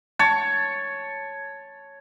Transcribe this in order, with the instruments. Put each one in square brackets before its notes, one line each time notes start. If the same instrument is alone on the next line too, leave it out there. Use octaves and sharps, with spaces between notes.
[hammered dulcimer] C#5 A5